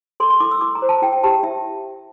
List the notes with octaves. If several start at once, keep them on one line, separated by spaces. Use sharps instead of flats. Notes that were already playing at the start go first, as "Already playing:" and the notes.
A4 C6
C6
E4 D6
E6
E4 D6
A#5
C5
A5
E4 G5
G5
G4 A5
E4 E5